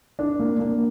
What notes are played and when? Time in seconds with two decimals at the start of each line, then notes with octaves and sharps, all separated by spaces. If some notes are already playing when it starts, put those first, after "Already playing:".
0.19 D4
0.39 A#3
0.59 A#3